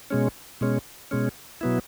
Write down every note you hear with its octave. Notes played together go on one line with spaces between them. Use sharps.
B2 G#3 C#4
B2 G#3 C#4
B2 G#3 C#4
B2 F#3 B3 E4